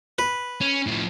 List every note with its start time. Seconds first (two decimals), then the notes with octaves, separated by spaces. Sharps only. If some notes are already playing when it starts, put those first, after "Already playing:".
0.19 B4
0.61 C#4
0.86 A2 F3